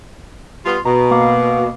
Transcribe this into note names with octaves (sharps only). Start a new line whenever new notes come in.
G3 B3 F4
B2 A#5
A#3 F5 D6